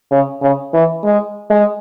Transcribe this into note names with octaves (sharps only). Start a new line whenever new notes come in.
C#3
C#3
E3
G#3
G#3